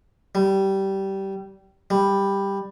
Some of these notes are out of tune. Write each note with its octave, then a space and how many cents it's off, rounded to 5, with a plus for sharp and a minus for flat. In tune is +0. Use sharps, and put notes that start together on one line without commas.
G3 -15
G3 +10